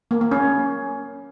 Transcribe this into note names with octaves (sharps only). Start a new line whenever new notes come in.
A#3
A#3
C#4